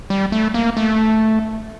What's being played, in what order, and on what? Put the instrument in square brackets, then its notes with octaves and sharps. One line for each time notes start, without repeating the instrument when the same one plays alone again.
[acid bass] G3
A3
A#3
A3